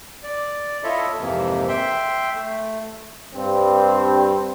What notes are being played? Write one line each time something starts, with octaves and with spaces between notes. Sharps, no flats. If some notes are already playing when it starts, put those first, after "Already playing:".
D5
E4 F4 A4 C#5 D#5 E5
F2 G#2 C3 E3 A#3
E5 G5 C6
A3
G2 C4